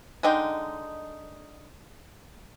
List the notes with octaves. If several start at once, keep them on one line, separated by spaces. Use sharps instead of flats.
D3 G#3 D#4 G5